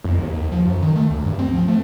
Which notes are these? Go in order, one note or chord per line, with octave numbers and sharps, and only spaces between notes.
F2
D#2
D#2
F3
F#2
D#3
A3
D2
G2
C4
F3
A3